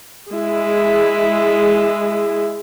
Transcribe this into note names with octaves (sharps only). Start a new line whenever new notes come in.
G#3 E4